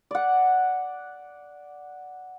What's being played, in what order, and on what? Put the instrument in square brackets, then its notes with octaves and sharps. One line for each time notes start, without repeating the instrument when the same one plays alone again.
[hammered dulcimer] D5 F#5